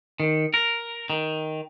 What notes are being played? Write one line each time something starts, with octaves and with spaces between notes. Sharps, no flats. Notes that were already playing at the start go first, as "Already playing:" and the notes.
D#3
A#4
D#3